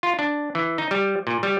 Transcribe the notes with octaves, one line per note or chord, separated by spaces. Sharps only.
F4
D4
E3
D#4
G3
A#2
G3